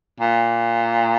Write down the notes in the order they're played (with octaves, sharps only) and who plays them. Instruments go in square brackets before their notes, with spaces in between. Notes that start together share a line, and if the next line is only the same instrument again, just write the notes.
[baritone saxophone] A#2